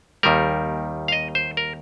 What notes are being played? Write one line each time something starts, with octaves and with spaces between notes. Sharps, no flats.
D#2 D#3 G3 A#4
F5
D#5
C5
A#4